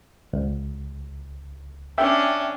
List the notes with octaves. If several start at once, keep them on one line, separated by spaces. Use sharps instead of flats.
C#2
C#4 D4 E5 G5